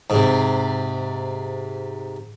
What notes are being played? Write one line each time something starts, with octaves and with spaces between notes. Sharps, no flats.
G#2 C3